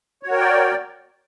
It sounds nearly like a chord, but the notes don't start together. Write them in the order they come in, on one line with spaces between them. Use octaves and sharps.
C#5 F#4 A#4 G5 D5